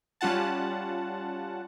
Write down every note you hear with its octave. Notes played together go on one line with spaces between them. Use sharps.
G3 C#4 F4 F#5 A5